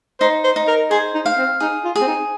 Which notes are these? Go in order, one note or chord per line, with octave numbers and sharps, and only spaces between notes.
D#4 C5
C5
D#4
A#4
G#4 C5
D#4
F5
C4
D#4 G#4
F4
G#4
C4
D#4